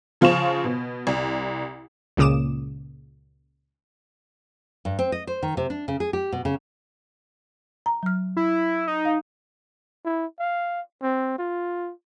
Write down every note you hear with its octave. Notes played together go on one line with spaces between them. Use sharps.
C#3 F3 F4 C5 C#6 E7
B2
C2
C#2 A#2 C#3 D6 D#6 E7
G2
C4
D#5
C5
D#3
C3
D4
C#3
G#4
G4
B2
C#3
A#5
F#3 F6
E4
D#4
F5
E4
F5
C4
F4